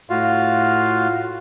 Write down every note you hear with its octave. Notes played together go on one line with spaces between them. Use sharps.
A2 F4 F#4 F5